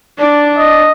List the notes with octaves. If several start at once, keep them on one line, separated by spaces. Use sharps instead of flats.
D4 D5
D#5